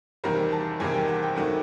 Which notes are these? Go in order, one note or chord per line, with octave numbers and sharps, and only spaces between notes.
E2 C3 D#3 G3 A#3 A#5
A5
E2 C3 D#3 G3 A#3 G#5
G5
F#5
G5
C3 D#3 F#3 A3 F#5